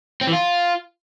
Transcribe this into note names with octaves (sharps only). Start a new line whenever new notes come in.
C4
E3
F4